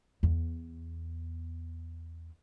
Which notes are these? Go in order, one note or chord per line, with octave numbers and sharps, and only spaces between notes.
E2 B3